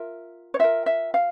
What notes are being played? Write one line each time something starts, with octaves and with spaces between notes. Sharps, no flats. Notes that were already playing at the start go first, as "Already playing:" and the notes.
Already playing: F4 A#4 E5
C#5
F4 A#4 E5
E5
F5